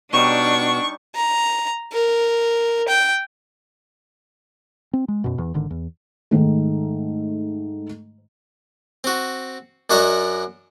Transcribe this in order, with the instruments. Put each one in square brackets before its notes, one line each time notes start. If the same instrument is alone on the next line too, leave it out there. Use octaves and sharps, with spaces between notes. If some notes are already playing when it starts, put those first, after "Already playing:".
[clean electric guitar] B2 [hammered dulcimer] G3 D#4 C#5 [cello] D4 [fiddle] C#6
[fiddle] A#5
A#4
G5
[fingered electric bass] C4
G#3
F#2 B2
E2
G#1 D3 D#3
E2
[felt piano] G#2 D#3 A3
[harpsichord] C4 F#4
F#2 D4 F#4 D5 D#5 A#5